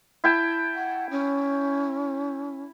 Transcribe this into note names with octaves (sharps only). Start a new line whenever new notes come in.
E4 G5 A5
F#5
C#4